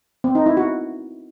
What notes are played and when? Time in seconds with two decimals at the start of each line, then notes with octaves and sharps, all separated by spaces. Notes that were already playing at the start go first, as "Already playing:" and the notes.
0.24 C4
0.35 D#4
0.46 E4
0.57 F#4